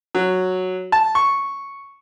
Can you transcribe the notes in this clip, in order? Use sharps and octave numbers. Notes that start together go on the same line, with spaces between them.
F#3
A5
C#6